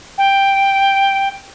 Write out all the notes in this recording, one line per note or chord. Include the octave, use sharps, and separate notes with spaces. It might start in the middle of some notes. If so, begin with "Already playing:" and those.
G5